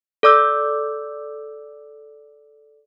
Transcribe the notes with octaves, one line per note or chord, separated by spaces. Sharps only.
A4 D5 D6 E6 G6